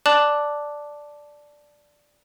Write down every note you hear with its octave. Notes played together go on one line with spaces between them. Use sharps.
D5 A5 D6 F#6 F#7